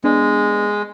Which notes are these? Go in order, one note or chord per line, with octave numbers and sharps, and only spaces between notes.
G#3 B3 D4